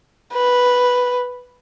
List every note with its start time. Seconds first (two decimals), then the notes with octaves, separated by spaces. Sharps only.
0.33 B4